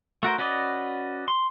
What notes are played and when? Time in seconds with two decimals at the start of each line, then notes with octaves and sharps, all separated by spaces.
0.23 A3 F#4 A#4 C5
0.38 C#4 F#4 B4 D5 D#5
1.28 C6